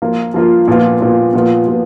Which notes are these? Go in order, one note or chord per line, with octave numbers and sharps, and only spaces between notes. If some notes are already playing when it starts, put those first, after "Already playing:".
F3 A#3 F4
F3 A#3 F4
A#2 F3 B3 F4
A#2 F3 B3 F4
A#2 F3 B3 F4
A#2 F3 B3